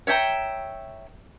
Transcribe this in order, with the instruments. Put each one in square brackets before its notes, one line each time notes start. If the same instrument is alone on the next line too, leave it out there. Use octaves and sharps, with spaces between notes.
[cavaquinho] C#5 E5 G5 A#5